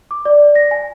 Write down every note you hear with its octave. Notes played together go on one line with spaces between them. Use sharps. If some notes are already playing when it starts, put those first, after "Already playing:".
D6
D5
A#6
G#5